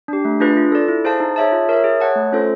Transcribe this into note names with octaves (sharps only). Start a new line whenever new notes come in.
D4 G4
A3
D4 F4 G#4 B4
F4
A4 D5
E4
G#4 C5 F5 A5
D#4
G#4 C#5 E5 A5
F4
A#4 C#5 E5
G#4
C#5 F#5 A5
A3
C#4 F4 A4 C5